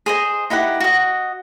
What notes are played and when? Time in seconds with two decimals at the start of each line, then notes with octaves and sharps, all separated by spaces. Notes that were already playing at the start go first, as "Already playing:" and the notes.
0.06 G#4 C5 D#5
0.50 D#4 E4 G4 F#5
0.80 F#4 D#5